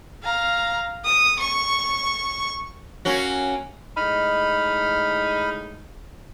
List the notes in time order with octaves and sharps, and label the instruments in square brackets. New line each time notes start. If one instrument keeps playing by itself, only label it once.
[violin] F5 A#5
D#6
C#6
[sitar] A#3 C#4 F#4
[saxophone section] A2 G#3 D#4 [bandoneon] B5 F6